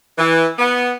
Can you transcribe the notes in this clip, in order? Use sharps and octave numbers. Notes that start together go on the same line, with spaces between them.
E3
B3